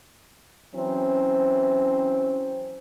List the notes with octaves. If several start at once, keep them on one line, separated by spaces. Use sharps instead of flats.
E3 F#3 C4 C#4